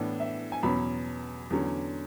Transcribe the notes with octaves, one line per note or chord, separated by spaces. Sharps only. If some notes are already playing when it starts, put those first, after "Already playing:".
Already playing: A2 E3 B3 D4
E5
G#5
E2 B2 F#3 C#4 B5
E2 D3 F#3 C#4